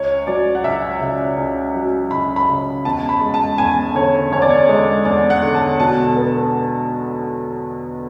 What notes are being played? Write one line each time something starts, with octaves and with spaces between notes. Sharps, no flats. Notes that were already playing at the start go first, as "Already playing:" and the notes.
Already playing: C#2 C#5
F#3 D5
F#5
C#2 E5
C#3 E5
C#2
F#3
C#2 B5
B5
C#3
E2 A5
B5
G#3
A5
E2 G#5
D3 C#5
E2 C#5
D5
C#5
G#3
E2 D5
F#5
D3
A5
B2 A5
B3